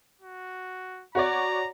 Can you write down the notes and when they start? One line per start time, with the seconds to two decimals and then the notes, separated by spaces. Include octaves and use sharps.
0.21 F#4
1.15 F#4 C#5 D5 A#5